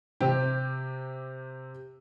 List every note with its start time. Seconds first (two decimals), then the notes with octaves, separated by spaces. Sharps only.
0.21 C3 C4 G4